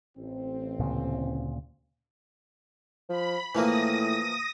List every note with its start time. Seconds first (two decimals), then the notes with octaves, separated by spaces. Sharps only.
0.17 A1 C4
0.79 D2 A#2 C#3
3.09 F3 B5
3.55 A2 E3 F3 A#3 D#6 A#6